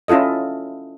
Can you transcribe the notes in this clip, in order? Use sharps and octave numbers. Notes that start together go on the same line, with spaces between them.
C#4 E4 F4 A4 D#5